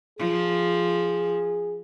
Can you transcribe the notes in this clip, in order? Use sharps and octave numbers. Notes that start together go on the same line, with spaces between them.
F3 G#4